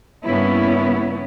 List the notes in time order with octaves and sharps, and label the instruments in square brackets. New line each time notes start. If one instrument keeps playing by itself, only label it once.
[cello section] G2 C#3 A#3 B3 C#4 E4